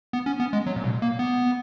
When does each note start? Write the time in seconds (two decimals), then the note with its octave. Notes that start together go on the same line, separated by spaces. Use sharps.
0.13 B3
0.26 C#4
0.40 B3
0.53 G#3
0.67 F#3
0.76 A#2
0.84 B2
1.02 A#3
1.19 B3